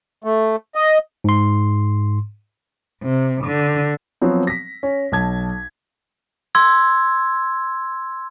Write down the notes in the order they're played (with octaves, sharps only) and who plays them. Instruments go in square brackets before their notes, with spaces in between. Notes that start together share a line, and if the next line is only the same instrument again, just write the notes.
[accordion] A3
D#5
[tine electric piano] G#2 C6
[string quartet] C3
D3
[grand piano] F3 F#3 B3 C4
A#6 B6
C#4
B1 A5 G#6
[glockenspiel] C6 E6 G#6